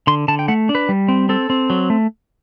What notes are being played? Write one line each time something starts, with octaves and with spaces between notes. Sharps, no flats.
D3 C6
D3 A5
G5
A3 F#5
D4
B4
G3
C4
C4 A4
C4
F#3
A3